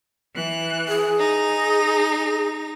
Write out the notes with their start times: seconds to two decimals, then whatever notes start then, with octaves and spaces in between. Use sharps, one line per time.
0.34 E3 F#6
0.88 G#4
1.18 D#4 A#6